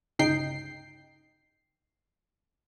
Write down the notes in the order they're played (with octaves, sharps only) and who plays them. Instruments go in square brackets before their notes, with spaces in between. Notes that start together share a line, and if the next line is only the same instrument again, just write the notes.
[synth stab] G1 C#2 D#4 G5 C7